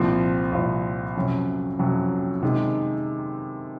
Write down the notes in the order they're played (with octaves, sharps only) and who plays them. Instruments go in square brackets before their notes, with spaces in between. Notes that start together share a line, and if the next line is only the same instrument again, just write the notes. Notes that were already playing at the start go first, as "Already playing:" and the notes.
Already playing: [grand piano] C2 A#2 F3 C4 F4
C2 A#2 F3 C4 F4
F2 C3 F#3 C#4
F2 C3 F#3 C#4
C3 D#3 G#3